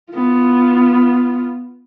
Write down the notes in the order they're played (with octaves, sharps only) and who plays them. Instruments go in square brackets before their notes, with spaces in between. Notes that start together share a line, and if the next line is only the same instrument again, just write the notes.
[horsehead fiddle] B3 F4